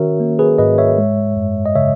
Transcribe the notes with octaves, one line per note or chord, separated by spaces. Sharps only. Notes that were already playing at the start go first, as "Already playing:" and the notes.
Already playing: D#3 C#4 F#4 A#4 C#5 E5
A#3
G#4 B4
G#2 B4 D#5
C#5 E5
G#3
F#2
D#5
C#3 C#5 E5